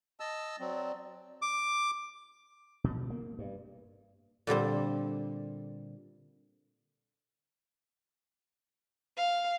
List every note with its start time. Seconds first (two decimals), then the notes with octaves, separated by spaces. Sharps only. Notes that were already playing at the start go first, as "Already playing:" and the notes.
0.20 D#5 A5 E6
0.60 F#3 C4 D5
1.42 D6
2.84 B2
3.10 A#3
3.39 G2
4.47 A#2 D3 G3 C4
9.17 F5